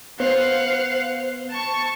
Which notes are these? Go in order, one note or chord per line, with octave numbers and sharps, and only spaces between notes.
B3 C5 F5 F#5
A5 C#6